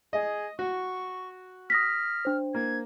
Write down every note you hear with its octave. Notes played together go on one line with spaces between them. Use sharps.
G#4 D#5
F#4 C#6
D#6 F6 A#6 B6
D4 C5
A#3 G#6